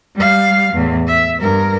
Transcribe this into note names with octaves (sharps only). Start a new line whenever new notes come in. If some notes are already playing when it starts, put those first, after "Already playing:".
G3 F5
E2 A2
E5
G2 A#4